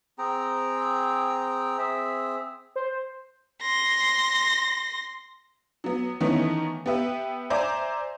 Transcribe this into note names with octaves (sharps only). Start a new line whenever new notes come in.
C4 G#4 G5 A#5
C4 G#4 E5
C5
C6 A#6
F#3 B3
D#3 E3 A3 B3 C#4 D#4
B3 G4 B4 E5
C5 D5 E5 G#5 A#5 D6